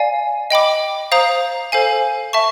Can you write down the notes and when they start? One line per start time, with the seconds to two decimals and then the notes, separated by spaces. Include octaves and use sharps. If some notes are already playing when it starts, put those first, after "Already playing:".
Already playing: D5 F5 G#5
0.50 D#5 G5 B5 D6
1.12 C5 F5 A#5 D#6
1.72 A4 C5 F5 G#5
2.33 E5 A5 C#6